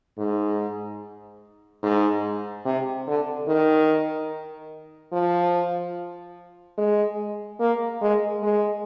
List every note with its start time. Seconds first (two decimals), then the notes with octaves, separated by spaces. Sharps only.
0.18 G#2
1.83 G#2
2.65 C3
3.07 D3
3.48 D#3
5.13 F3
6.78 G#3
7.60 A#3
8.02 G#3
8.43 G#3